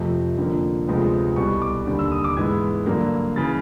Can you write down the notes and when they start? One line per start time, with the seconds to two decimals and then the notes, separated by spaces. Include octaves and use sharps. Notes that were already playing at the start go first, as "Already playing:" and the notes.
Already playing: F2 C3 F3 A3
0.37 F2 D3 F3 A#3
0.87 D2 C3 F3 G#3 B3
1.36 C2 B2 G3 C#6
1.62 D6
1.87 D#2 D3 G3
1.99 E6
2.12 D#6
2.24 D6
2.37 G#2 E3 G#3 B3 G#6
2.86 G2 D3 F#3 A#3
3.36 C#3 E3 A6